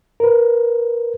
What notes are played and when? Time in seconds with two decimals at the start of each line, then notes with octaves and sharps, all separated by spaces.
0.20 A#4 B4